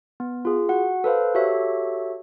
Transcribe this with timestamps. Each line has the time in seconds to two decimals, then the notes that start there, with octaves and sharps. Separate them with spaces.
0.20 B3
0.45 F4 G#4
0.69 F#4 F#5
1.04 A4 B4 C5 F5
1.34 F#4 G4 A4 C#5 E5